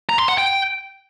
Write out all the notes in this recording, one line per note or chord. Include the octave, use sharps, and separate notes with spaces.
A#5
C6
F#5
G5